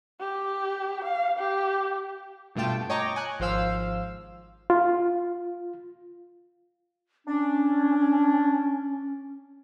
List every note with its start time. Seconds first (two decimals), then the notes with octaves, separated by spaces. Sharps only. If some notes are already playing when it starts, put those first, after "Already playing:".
0.20 G4
1.04 F5
1.39 G4
2.55 G2 B2 A3 F4 G5 A5
2.90 C#5 D#5 G5 A#5 C#6 D6
3.16 G#5 F#6
3.40 G#1 F3 C5 F5 E6
4.70 F4
7.27 C#4 D4